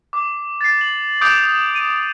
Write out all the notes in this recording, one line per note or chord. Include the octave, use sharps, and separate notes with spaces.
D6
A6 C7
F#7
D6 D#6 G6 D7 F7
D#7